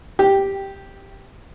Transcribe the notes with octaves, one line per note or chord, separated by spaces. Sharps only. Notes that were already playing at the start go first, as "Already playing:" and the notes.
G4